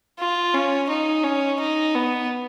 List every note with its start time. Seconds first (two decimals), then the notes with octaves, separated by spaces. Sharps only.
0.19 F4
0.54 C#4
0.89 D#4
1.24 C#4
1.60 D#4
1.94 B3